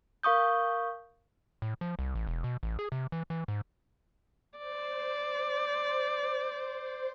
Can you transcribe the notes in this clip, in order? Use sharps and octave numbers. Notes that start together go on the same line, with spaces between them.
A#4 F5 C#6 D#6 G6
A2
F3
C2
A1
E1
B2
A1
G#4
C3
E3
E3
G#2
C5 D5